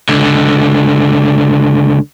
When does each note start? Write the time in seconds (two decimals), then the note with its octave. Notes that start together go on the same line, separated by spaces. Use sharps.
0.09 C#2 D3